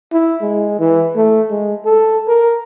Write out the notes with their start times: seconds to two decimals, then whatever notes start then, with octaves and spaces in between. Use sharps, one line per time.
0.12 E4
0.42 G#3
0.79 E3
1.16 A3
1.51 G#3
1.85 A4
2.28 A#4